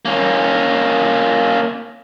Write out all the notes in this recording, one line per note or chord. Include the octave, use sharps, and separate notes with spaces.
A#3 C#4